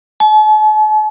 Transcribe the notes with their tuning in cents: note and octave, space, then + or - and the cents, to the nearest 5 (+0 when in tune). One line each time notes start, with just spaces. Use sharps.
A5 -45